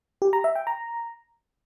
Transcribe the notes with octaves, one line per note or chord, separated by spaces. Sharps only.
G4
A#5
E5
G5
A#5